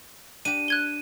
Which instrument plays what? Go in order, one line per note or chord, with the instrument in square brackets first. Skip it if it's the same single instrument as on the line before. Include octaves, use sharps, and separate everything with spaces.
[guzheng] D4 G4 [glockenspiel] D#7
[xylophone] F#6 G#6 G7